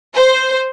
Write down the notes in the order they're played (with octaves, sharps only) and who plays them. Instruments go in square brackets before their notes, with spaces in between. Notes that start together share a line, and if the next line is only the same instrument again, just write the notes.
[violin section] C5